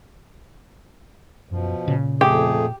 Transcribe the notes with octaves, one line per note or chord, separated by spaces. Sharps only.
F#2 B2 F3
A#2 C#3
F2 A3 G4 G#4